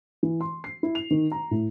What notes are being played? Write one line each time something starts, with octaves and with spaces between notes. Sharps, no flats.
E3
C6
C7
E4
F7
D#3
A#5
A2